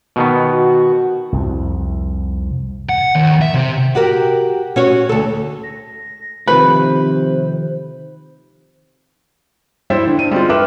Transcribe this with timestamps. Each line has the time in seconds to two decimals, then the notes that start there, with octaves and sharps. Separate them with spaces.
0.16 B2 D#3 B3
0.49 F#4
1.33 C2 F2
2.89 F#5
3.15 D#2
3.41 E5
3.54 C3
3.95 F#4 G4 A#4
4.76 C#4 F#4 C#5
5.09 D2 A4
5.63 A#6
6.48 C3 D#3 F3 A3 B4 C5
9.90 G3 E4 C5 E5
10.07 D3
10.19 G2 D#7
10.31 G3 G#3 C4 F4
10.49 B4 E5 D6 F6